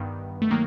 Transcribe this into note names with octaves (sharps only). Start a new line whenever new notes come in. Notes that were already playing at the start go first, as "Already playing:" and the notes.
Already playing: G2 D#3 G3 B3
A3
D#3 F#3 A#3